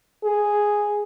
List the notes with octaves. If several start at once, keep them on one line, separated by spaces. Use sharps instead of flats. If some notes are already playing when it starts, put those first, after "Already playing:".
G#4